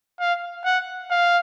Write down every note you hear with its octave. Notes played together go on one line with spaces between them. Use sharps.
F5
F#5
F5